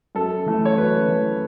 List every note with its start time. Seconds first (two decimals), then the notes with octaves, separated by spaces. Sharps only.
0.15 F#2 A4
0.46 E3 A3
0.65 C#5
0.77 F#2 B4
1.09 E3 A3